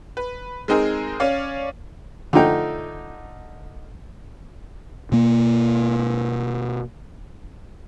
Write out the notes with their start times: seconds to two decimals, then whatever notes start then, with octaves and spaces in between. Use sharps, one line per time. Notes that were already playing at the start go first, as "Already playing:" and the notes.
0.17 B4
0.68 G#3 C4 D#4 G#4 A#4
1.20 C#4 C#5 D5 F5
2.33 D3 F3 A3 D#4 G5
5.12 B2 A#3